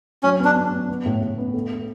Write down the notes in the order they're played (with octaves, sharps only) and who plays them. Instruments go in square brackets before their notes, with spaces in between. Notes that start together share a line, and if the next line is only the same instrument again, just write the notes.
[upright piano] F#3 [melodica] C#4
[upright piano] B3 [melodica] D4
[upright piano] B3
B3
B3
A2
A2
B3
A3
A3